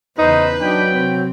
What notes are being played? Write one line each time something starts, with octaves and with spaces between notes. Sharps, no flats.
E2 C#3 D#4 B4 C5
F#3 D4 D#4 G5
C3 C4